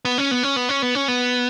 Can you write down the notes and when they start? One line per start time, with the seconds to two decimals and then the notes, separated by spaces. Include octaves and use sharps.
0.05 B3
0.18 C#4
0.31 B3
0.43 C#4
0.56 B3
0.69 C#4
0.82 B3
0.95 C#4
1.08 B3